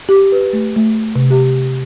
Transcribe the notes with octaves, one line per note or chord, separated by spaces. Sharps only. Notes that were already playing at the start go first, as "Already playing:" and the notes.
G4
B4
A3
A3
C3
G4